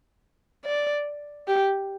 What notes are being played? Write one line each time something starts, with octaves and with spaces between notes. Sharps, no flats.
D5
G4